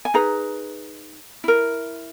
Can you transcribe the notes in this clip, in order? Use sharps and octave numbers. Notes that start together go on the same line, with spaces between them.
G#5
D#4 G#4 B4 A#5
E4 A#4